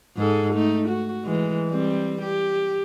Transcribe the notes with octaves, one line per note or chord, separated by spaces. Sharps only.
G#2 G#4 A4
A3 D#4
F#4
E3 G#3
G3 C4
G4